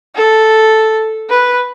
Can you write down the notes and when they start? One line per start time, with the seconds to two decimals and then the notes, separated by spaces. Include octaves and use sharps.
0.15 A4
1.29 B4